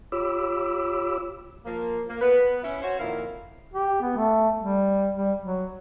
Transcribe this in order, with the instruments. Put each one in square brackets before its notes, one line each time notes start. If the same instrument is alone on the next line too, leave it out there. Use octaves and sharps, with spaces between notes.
[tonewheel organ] F4 G4 C#5 B5 D6 E6
[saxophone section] F3 A#3
A#3
B3 B4
C#4 E4
F#4 C5 C#5
F2 A#2 D#3 E4 A#4 F5
[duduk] G4
B3
A3
G3
G3
F#3